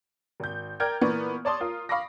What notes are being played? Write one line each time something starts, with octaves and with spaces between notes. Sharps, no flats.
G#1 G6
A#4 D5 G5 F6 G6 G#6
A#2 E3 B3 A#4 D5 C#6
C#5 D5 A5 C6 D#6
F4 A#4
F5 B5 C#6 D6 A#6